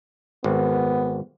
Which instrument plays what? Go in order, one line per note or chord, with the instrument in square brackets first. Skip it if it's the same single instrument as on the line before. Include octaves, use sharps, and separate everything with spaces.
[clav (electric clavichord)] G#1 [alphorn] B3